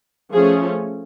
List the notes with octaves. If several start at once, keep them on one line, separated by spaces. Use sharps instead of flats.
F3 A3 C#4 G#4